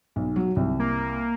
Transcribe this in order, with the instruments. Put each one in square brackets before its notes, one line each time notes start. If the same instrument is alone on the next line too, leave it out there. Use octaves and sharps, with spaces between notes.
[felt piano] B1
F#3
C2
[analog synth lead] A#3